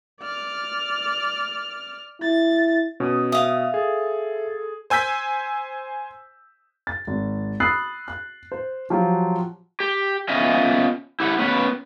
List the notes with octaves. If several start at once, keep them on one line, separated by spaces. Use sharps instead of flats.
D5 F6
E4 A6
B2 C#4 D#6
E5 F5 D#6
G#4 A4
C5 G#5 E6 G6 B6
A6
G#1
B5 D#6 E6 F#6 A6 C7
F#6
C5
F3 F#3 F4 G4
G4
B3 C#4 F4 D#5 E5
E4 G4 F#5
B3 C#4 B4